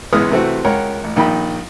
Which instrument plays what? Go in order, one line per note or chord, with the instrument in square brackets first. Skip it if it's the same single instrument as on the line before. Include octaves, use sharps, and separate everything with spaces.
[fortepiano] C#2 E3 G#3 B3 D#6 F6
C3 E3 A3 C4 F#4
C#2 A#4 C#5 F#5 G5
A1
A#1 D#3 G5 B5